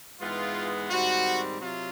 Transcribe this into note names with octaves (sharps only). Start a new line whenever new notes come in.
G#2 E3 G#3 B3 F4
G#2 D#3 G3 C4 F#4
C3 F#3 F4